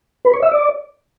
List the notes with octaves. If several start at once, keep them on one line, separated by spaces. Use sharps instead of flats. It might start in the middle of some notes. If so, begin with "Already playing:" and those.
B4
C#5
E5
D5